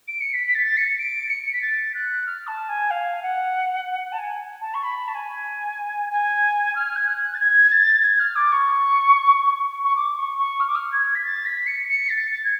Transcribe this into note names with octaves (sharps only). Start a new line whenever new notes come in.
D7
C#7
B6
B6
A6
C#7
D7
C#7
C#7
B6
A6
F#6
F6
A5
G#5
F5
F#5
A5
G#5
A5
C#6
B5
A5
G#5
G#5
F6
G#6
F#6
A6
G#6
A6
G#6
F6
D6
C#6
C#6
D6
C#6
C#6
F6
D6
F6
G#6
B6
A6
B6
C#7
C#7
A6
A6
G#6